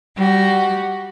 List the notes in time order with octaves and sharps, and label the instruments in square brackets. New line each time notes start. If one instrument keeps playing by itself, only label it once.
[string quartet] G3 F#4